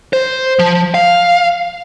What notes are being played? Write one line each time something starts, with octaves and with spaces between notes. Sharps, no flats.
C5
F3
F5